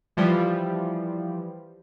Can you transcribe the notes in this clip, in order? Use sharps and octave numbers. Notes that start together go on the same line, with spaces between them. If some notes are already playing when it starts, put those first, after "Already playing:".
E3 F3 G3